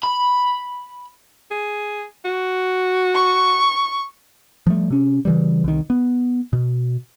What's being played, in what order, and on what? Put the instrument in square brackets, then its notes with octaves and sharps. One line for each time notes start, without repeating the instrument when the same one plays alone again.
[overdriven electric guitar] B5
[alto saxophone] G#4
F#4
[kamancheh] C#6
[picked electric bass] F3 G3 A3
C3 C#4
C#3 E3 G3
C2 D#3
B3
B2